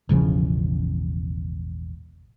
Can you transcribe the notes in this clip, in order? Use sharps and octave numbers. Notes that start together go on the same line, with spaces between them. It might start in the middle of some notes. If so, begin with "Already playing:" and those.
E1 A1 C#3 F3